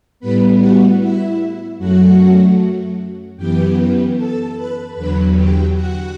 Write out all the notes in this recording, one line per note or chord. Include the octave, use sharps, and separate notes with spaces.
A2 G3 B3 B4 B5
F#4 F#5
E4 E5
F#2 F#3 A3 F#4 F#5
F#2 E3 B3 G4 G5
A4 A5
B4 B5
E2 D3 F#3 B4 B5
G4 G5
F#4 F#5